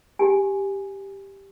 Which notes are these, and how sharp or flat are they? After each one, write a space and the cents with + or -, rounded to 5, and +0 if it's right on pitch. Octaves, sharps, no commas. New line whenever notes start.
G4 +0 G#5 +0